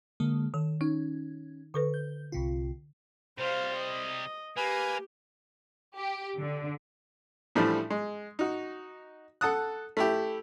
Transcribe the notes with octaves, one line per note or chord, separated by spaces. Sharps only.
D3 G#3 A#3
D#3 A4
C#4 D#4
D3 A4 B4 C#6
G6
C2 C3 F4
C3 G3 C5 F5
D#5
A#3 G4 B4 G#5
G4
D3
A2 E3 F3 G3 A3 D4
G#3
D#4 F#4
A4 F#5 A5 D#6 F#6
A3 E4 G4